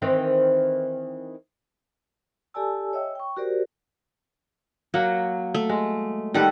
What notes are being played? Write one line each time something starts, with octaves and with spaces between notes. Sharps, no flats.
D#3 E3 C4
G4 A4 D5 G#5 A5 E6
C#5 D#5 E5 G5 E6
G5 C#6
F#4 G4 A#4 C5 D5
F#3 A#3 F#5
A3
G#3
D#3 G3 A4 B4 F#5